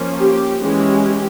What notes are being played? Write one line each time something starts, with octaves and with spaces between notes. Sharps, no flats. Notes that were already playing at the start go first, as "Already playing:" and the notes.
Already playing: F3 A#3 C#4
G4
E3 G#3 C#4 G4